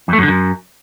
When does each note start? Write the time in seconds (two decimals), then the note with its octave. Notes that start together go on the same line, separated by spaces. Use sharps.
0.08 F2
0.13 A3
0.18 F#2
0.23 D3
0.28 F#2